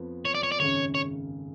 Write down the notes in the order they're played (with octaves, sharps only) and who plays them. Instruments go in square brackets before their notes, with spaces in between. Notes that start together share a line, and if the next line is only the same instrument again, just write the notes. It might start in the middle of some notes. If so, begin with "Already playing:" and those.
Already playing: [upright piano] F2 F3 B3
[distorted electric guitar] C#5
D5
C#5
D5
[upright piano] G#1 F#2 C#3 [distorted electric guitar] C#5
[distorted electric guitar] C#5